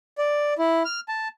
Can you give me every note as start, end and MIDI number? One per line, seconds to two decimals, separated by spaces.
0.18 0.54 74
0.58 0.83 64
0.85 1.00 89
1.09 1.28 81